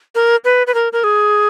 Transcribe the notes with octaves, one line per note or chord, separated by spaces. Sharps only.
A#4
B4
B4
A#4
A#4
G#4